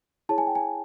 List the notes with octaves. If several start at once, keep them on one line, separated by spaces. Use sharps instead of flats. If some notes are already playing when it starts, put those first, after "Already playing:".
E4 G#4 C#5 A5
G#5
G5
G#5